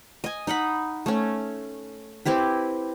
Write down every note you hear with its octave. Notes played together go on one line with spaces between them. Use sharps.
D#5 G#5
D#4 D#5 F#5 B5
A3 C#4
C4 E4 G4 B4